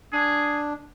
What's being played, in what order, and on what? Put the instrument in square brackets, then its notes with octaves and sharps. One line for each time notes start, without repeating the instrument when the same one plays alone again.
[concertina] D4 [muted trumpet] G#4